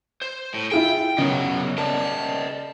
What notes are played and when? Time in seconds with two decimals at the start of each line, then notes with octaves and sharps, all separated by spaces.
0.22 C5
0.54 A2
0.71 E4 F4 G#4 G5
1.18 C#3 F#3 B3 A#4 D#5
1.78 A#4 D5 D#5 A5